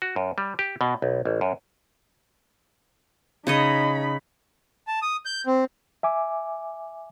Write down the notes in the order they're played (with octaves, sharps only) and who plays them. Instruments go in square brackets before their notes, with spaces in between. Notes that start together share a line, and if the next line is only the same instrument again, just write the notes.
[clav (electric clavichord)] F#4
F#2
G3
G4
B2
B1
A1
F#2
[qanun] C#3 C#5 D#5 [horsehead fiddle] D#4 B5
[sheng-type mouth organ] A5
D#6
G6
C4
[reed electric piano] E5 G#5 D6